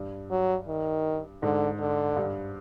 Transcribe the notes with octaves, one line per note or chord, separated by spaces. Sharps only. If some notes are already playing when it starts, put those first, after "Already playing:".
Already playing: G2
F#3
D#3
G#2 D3
D3
G2